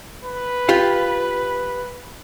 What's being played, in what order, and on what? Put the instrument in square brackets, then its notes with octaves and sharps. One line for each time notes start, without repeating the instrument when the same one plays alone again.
[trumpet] B4
[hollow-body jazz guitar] F4 G4 F5